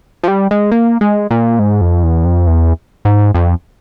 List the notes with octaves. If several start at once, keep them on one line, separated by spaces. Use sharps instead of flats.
F3
G3
G#3
A#3
G#3
A#2
G#2
F2
E2
F2
E2
G#2
F2